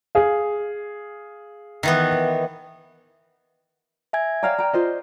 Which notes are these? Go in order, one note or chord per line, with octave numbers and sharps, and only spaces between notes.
G#4 F5
D#3 E3 B3
E5 G#5 G#6
C#5 D5 F5 G5 A#5 F6
D5 G5 A#5
F4 C5 D#5